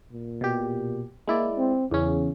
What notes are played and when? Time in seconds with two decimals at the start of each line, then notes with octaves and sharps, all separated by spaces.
0.12 A#2
0.41 B2 G4
1.28 G#3 A#3 E4 D5
1.58 C4
1.91 E2 C#3 C#4